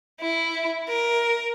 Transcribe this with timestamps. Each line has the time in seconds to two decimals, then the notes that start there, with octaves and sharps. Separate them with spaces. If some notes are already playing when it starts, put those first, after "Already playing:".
0.20 E4
0.88 A#4